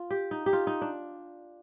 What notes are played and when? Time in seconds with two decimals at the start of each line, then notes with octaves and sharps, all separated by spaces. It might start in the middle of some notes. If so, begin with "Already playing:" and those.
Already playing: F4
0.11 G4
0.31 D#4
0.46 G4
0.53 F4
0.67 D#4
0.82 D4